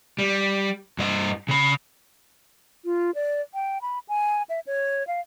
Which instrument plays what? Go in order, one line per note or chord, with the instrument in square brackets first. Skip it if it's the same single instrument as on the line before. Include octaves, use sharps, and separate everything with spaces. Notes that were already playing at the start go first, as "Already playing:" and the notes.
[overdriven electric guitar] G3
G2 D#5
C#3 B5
[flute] F4
D5
G5
B5
G#5
E5
C#5
F5